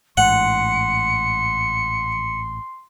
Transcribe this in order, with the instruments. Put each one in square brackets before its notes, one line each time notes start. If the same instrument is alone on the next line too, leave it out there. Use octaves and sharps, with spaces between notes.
[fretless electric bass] A1 G#2 [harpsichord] F#5 [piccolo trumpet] C6 [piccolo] C#7